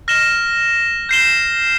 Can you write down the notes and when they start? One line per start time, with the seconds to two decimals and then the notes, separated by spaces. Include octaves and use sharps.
0.08 F6 A#6 E7 G7
1.09 G6 C7 E7 G7